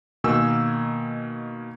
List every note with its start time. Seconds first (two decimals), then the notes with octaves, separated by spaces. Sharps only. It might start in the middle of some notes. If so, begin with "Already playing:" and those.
0.24 B2 D#3 A#3 G#5 E6